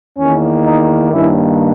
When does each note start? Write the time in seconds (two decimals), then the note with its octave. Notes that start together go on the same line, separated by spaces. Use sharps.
0.18 E2 D#3 A#3 C#4
0.65 D#4
1.12 G2 D#3 A#3 C#4 E4